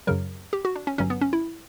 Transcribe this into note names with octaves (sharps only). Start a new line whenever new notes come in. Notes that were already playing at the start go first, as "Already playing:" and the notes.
F#2 C#3 F#3 A#4
G4
F#4
D4
C#4
G1 G2 F#3 C#4
B3
C#4
E4